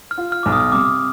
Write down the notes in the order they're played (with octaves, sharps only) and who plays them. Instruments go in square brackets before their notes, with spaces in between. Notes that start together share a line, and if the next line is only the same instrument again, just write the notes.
[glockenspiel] F6
[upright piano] F4
[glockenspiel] F6
[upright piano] B1 [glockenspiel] D6
[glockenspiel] D#6
[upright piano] C3 [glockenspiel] D6